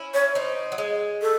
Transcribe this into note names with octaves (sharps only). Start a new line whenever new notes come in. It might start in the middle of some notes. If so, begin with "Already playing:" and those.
Already playing: C#4 E4
C#5
C4 D#4
F#3
G#3
A4